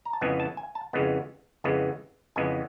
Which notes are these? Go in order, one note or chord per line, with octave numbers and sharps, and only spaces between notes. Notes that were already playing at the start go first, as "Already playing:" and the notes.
A#5
A5
F2 C#3 E3 G#3 B3 G#5
A5
G#5
A5
F2 C#3 E3 G#3 B3
F2 C#3 E3 G#3 B3
F2 C#3 E3 G#3 B3 G#5